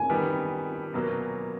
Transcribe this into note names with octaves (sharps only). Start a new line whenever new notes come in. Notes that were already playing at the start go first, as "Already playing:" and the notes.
Already playing: G#5
D#3 G3 B3
B2 F#3 A#3